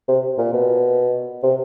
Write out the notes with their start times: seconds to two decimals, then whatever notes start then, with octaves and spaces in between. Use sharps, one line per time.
0.08 C3
0.38 A#2
0.53 B2
1.43 C3